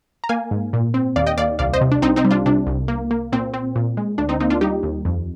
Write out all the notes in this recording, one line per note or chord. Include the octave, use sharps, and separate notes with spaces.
A#5
A#3 F5 G#5
G#2
A#2
C4
D#2 D5 F5
D#5 G5
D#2 D5 F5
C2 D5 F5
C5 D#5
C3
D4
C2 C4 D#4
C4 D#4
G3
D4 F4
C3 D4
C2
A#3
A#3
A#2 C4
C4
A#2
G#3
D2 D4
C4 D#4
A#3 C4 D#4
D4 F4
G3 D#4 G4
D#2
F2